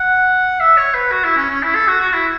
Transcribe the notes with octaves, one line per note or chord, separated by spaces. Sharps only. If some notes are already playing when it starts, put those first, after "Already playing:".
Already playing: F#5
E5
C#5
B4
F#4
E4
C#4
C#4
E4
A4
F#4
F#4
E4